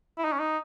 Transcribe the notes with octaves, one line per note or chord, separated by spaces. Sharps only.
E4
D#4
C#4
D#4